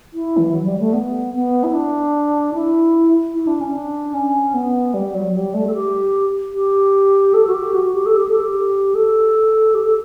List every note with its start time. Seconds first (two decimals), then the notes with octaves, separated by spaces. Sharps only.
0.13 E4
0.37 E3
0.52 F#3
0.65 G3
0.80 A3
0.93 B3
1.34 B3
1.64 E4
1.73 D4
2.54 E4
3.34 E4
3.47 D4
3.61 C#4
3.74 D4
4.14 C#4
4.54 B3
4.94 G3
5.14 F#3
5.34 G3
5.54 A3
5.67 A4
5.74 G4
6.54 G4
7.34 A4
7.47 F#4
7.54 G4
7.74 F#4
7.95 G4
8.06 A4
8.17 G4
8.29 A4
8.40 G4
8.95 A4
9.74 G4
9.84 A4